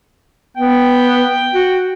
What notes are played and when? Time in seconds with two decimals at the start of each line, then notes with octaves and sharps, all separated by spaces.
0.57 B3 G5
1.53 F#4